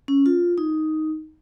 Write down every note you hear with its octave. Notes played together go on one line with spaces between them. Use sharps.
C#4
F4
D#4